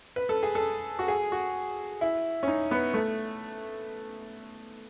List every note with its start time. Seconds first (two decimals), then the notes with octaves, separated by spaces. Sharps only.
0.16 B4
0.29 A4
0.43 G#4
0.55 A4
0.99 F#4
1.08 G#4
1.32 F#4
2.01 E4
2.43 C#4
2.48 D#4
2.71 B3
2.94 A3